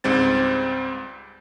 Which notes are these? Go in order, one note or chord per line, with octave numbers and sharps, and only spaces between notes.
C#2 G#2 G3 C4 A6